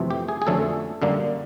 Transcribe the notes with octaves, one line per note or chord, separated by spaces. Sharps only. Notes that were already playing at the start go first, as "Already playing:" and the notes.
Already playing: F2 C3 E3 A3 C4
G4
G#4
G#4
F2 D3 F#3 A3 C#4 A4
F#2 D3 G3 A#3 D4